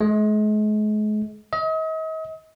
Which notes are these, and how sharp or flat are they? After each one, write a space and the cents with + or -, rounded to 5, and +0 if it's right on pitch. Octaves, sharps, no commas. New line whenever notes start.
G#3 +40
D#5 +40